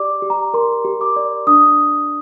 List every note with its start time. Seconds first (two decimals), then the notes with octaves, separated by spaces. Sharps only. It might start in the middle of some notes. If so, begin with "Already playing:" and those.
Already playing: G4 D5 D6
0.22 G4
0.30 A#5
0.54 A#4 C6
0.85 G4
1.01 D6
1.16 D5
1.47 D4 D#6